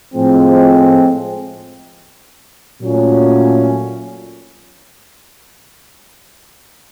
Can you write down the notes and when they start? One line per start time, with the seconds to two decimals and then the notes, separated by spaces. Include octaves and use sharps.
0.14 A2 F3 G#3 C4
2.81 A#2 F#3 A3 C#4